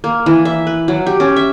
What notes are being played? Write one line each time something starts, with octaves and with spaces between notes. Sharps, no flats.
A#3
E3
E5
B4
F#3
G4
C#4
E5